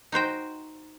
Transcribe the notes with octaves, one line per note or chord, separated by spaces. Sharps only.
D#4 F#4 C5 G5